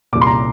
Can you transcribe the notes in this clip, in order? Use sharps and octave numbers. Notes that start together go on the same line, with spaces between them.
C2 A#2 D6
C6
A#5